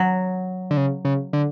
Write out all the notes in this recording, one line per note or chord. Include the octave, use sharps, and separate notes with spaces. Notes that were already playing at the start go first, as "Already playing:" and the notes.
Already playing: F#3
D3
C#3
C#3
D3